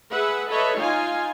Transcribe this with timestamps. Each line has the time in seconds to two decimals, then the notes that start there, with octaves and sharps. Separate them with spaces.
0.13 G#4 B4 E5 F#5
0.50 A4 B4 C#5 D#5 E5
0.80 D#4 F4 F5 G#5